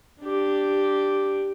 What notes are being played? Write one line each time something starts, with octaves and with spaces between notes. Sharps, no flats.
D4 G4